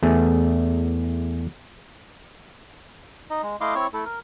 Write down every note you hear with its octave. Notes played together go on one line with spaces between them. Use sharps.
E2 A3 G#4
D#4 D#5
G#3
A3 E4 D#5 F5 C6 D6
C4 E4 C#5 C#6
A3 E4 A4
A#4